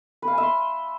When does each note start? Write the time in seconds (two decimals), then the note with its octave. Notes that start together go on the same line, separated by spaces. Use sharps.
0.22 B4
0.28 F5
0.33 G#5
0.38 E5
0.43 C6